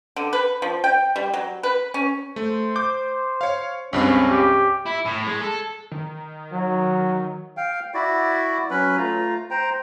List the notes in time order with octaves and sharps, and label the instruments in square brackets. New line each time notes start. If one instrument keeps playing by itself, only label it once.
[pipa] D3
B4
F3
G5
G3
F#3
B4
C#4
[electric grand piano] A3 [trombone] C5
[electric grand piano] D6 G6
C#5 F5
[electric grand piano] C#2 G2 C4 [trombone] C#4
[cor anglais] G4
[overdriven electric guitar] E4
A2
G#3
A4
[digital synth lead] D#3
[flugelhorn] F#3
[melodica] F5 G5
E4 F#4 D5
F#3 C#4 B4 B5
A3 F4 A#5
C5 G5 A#5